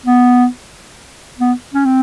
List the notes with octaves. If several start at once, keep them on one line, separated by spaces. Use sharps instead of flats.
B3
B3
C#4
C4